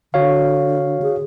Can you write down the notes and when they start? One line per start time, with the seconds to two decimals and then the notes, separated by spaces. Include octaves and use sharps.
0.14 D3 F#4 C#5 F5
1.02 G#4